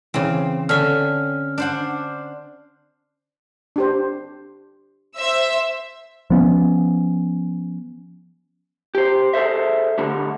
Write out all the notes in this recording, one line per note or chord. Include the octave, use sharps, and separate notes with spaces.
C#3 E3 C4
D3 C#4 E5 F6
D4 C5 F#5
D4 G4 C5
C5 E5 E6
F3 B3 C#4
G4 C5
G#4 A4 C5 E5
D2 A2 D3 G3